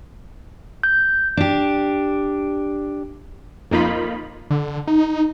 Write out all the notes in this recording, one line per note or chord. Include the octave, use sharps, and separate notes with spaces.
G6
D4 G4
F2 A#3 D#4 F4 B5
D3
D#4